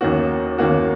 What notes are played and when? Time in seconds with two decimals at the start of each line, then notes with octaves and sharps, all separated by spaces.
0.01 D#2 D#3 A#3 C#4 F#4
0.58 D#2 D#3 A#3 C#4 F#4